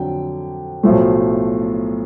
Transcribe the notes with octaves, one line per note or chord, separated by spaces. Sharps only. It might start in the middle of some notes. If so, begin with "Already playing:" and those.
Already playing: F2 D3 F#3 G5
B1 A2 F3 A3